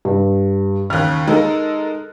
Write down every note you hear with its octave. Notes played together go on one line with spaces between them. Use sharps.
G2
D#2 C#3 F6 F#6
G#3 D#4 A4 A#4